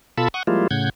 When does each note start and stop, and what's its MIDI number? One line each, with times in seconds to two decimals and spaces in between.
0.18 0.28 47
0.18 0.28 65
0.18 0.28 69
0.18 0.28 81
0.18 0.28 83
0.18 0.28 88
0.34 0.43 78
0.34 0.43 85
0.34 0.43 87
0.47 0.67 53
0.47 0.67 55
0.47 0.67 56
0.47 0.67 58
0.47 0.67 64
0.47 0.67 65
0.71 0.90 45
0.71 0.90 49
0.71 0.90 78
0.71 0.90 91
0.71 0.90 92